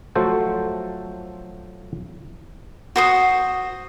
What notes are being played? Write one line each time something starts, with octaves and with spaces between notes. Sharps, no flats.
F3 F#3 A3 F#4 A4 C5
F#4 C5 D#6